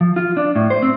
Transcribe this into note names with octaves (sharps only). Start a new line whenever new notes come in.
F3
F4
D4
A2
C5
C4